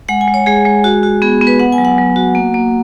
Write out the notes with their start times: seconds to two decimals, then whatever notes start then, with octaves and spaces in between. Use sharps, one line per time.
0.09 G#3 F#5
0.21 G#5
0.28 G#3
0.34 C#5
0.46 G#3 G#4
0.65 G#3
0.84 F#4
1.03 F#4
1.22 B3 G#4
1.41 B3
1.47 B4
1.59 B3 F#5
1.72 G#5
1.78 F#3
1.85 F#5
1.98 F#3
2.16 F#4
2.35 A#3
2.54 A#3